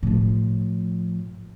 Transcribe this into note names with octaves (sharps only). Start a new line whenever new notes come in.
A2 F3